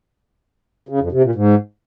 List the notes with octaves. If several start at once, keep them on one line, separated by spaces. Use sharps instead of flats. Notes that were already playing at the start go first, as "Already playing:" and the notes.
C#3
F2
C3
A#2
G#2